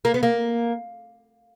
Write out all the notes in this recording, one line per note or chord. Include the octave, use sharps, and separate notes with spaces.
A#3
B3
A#3